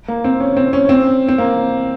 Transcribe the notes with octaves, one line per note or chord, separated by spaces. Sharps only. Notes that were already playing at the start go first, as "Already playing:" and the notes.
A#3
C4
C#4
C4
C#4
C4
C4
A#3